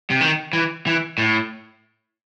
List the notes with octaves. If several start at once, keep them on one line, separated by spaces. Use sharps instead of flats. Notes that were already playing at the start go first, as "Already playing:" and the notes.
C3
D#3
E3
E3
A2